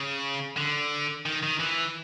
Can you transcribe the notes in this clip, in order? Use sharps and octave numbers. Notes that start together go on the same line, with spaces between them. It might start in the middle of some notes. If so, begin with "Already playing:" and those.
Already playing: C#3
D3
D#3
D#3
E3